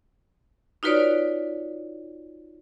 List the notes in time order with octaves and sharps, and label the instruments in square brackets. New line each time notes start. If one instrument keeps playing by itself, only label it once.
[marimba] D#4 F4 F#4 B4 C#5 D5